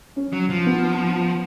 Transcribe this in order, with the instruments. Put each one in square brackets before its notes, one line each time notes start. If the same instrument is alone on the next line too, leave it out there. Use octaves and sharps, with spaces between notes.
[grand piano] C#4
[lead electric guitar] F#3
F3
[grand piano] B3